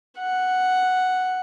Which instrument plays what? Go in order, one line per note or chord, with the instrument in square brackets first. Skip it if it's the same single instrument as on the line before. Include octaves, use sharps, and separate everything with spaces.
[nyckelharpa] F#5